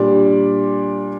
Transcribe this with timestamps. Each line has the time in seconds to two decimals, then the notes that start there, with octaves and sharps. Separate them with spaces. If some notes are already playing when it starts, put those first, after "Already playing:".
Already playing: A#2 G3 D4 G4 D5